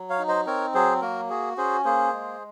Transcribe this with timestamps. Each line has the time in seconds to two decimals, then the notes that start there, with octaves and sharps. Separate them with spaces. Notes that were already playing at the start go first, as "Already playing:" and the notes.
Already playing: F#3
0.10 C#5 F5
0.19 D#4
0.28 C5 D#5
0.47 C4 A#4 C#5
0.74 F#3 G#4 C5
1.02 A#3 F#4 A#4
1.30 F#4 G#4
1.57 C#4 G#4 C5
1.85 A#3 G#4 C5
2.13 G#3